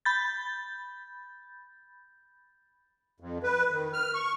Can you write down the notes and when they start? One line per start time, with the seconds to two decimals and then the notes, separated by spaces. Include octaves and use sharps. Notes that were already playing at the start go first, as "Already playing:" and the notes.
0.05 B5 G6 A6
3.20 F2
3.43 B4
3.71 D#3
3.93 F6
4.14 C#6